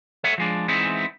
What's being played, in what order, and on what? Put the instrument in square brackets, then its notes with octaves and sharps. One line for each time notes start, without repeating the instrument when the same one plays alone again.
[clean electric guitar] A4 C#5 E5 F#5
F3 G#3 D4
E3 G#3 B3 C4 D#4 E4